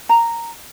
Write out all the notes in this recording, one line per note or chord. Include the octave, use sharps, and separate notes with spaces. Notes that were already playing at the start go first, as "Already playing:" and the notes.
A#5